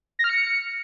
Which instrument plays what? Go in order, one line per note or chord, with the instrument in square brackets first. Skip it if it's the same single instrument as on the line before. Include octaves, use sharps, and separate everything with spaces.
[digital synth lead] A#6
F6
C#7